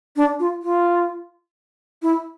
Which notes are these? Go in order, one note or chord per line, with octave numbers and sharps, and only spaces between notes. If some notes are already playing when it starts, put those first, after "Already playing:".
D4
F4
F4
E4